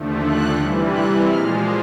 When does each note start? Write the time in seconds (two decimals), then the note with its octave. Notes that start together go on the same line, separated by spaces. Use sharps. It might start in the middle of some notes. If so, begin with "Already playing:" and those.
Already playing: D#2 D3 F3 A3
0.25 F#6
0.59 C3 E3 G3
0.94 F#6
1.28 A#2 F3 G#3 F6